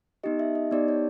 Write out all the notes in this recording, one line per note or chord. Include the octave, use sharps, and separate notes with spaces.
B3 D#4 G4 D#5
E5
D#5
B3 D#4 G4 D5
C#5